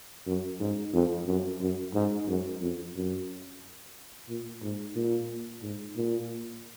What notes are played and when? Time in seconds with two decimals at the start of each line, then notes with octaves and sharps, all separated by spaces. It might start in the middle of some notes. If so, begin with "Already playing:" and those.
0.27 F#2
0.60 G#2
0.93 F2
1.27 F#2
1.61 F#2
1.94 G#2
2.28 F#2
2.61 F2
2.95 F#2
4.29 A#2
4.62 G#2
4.96 A#2
5.62 G#2
5.97 A#2